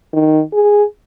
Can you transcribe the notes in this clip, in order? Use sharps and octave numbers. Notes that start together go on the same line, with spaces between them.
D#3
G#4